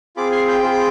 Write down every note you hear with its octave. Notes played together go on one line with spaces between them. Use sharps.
C4 F4 G#4 B5 D6
G#5 C6
G5 B5
C4 F4 G#4